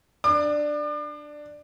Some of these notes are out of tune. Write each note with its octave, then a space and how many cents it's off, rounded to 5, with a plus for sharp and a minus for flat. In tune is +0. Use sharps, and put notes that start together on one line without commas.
D4 +10 D6 +40